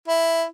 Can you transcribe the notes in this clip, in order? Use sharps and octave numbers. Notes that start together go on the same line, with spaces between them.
E4